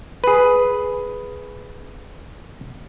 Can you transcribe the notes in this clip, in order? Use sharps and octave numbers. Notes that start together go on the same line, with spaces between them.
G#4 B4